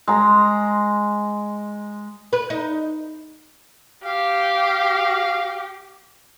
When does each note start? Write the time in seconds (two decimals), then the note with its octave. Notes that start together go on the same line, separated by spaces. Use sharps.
0.08 G#3 A#5
2.33 B4
2.50 D#4
4.05 G4 F5